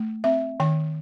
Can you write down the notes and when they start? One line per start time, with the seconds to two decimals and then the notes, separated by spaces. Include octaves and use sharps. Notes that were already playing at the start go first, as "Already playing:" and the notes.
Already playing: A3
0.24 C4 E5
0.60 D#3 G5